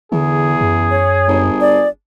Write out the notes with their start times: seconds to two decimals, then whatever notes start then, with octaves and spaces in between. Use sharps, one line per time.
0.12 E2 D3 G#4
0.61 F#2
0.91 C#5
1.28 G1
1.61 D5